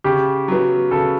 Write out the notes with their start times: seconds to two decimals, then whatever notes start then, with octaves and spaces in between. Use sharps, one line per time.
0.04 C#3 G4
0.48 F#3 B3
0.91 C#3 A4